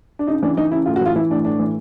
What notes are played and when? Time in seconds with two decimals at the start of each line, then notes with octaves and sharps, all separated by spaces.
0.19 D4
0.27 C#3 D#4
0.43 E3 D4
0.57 E3 D#4
0.71 C#3 E4
0.86 A2 F4
0.96 F#4
1.01 E3 F4
1.16 E3 E4
1.30 A2 D4
1.45 A2 D4
1.59 E3